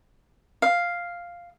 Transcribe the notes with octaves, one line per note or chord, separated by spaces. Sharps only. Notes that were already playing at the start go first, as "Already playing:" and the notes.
F5